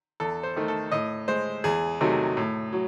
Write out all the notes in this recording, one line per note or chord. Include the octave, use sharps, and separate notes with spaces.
E2 A4
C5
D#3 A3
A4
A2 D#5
G#3 C5
E2 G#4
C3 D#3 F#3 A3
A2
F#3